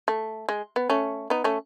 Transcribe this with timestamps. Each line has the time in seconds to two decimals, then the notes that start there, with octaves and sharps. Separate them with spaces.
0.08 A3
0.49 G#3
0.76 B3
0.90 A3 C#4
1.30 B3 D#4
1.44 A3 C#4